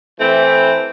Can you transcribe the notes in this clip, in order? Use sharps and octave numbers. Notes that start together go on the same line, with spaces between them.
E3 A3 C4